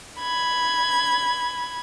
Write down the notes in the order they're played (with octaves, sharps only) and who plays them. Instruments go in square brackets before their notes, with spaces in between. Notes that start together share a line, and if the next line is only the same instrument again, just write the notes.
[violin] B5 G#6